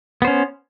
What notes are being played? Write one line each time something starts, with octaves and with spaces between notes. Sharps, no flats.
B3 C#4 C5